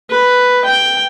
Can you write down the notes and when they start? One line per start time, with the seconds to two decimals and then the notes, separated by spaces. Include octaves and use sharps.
0.11 B4
0.64 G5